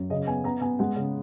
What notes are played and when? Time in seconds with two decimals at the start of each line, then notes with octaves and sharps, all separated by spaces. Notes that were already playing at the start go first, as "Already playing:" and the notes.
Already playing: F#2
0.10 C#3 D#5
0.27 B3 G#5
0.44 B3 A#5
0.62 B3 G#5
0.79 G#3 F#5
0.96 C#3